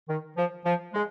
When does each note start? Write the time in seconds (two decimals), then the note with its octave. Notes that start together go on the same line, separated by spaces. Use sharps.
0.08 D#3
0.37 F3
0.65 F3
0.94 G#3